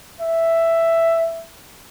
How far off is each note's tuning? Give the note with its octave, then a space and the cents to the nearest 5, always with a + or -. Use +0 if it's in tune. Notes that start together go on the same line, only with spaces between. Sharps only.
E5 +5